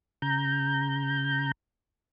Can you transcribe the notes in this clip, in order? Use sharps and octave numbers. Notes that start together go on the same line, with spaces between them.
C#3 A#5 G6